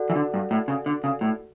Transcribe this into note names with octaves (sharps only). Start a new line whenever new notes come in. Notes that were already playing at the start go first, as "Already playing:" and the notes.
Already playing: F#4 A4 D5 F#5
E3
D3
G2
A2
C#3
D3
C#3
A2